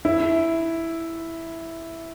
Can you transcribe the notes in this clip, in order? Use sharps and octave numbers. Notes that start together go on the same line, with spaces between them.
E4